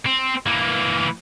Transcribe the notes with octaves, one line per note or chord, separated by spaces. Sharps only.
C4
E3 A#3